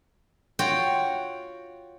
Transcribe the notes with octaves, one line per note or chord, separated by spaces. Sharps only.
F4 F#4 C#5 G5